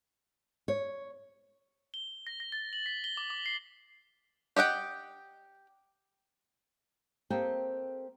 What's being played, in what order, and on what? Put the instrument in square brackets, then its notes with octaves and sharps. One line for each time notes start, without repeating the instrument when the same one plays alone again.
[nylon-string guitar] C#5
[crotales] G7
A#6
A#6
A6
F#7
B6
G7
D6
D6
C7
[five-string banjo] G4 D#5 F#5 G5
[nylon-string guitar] A#3 C4 G4 A4 D#5 G5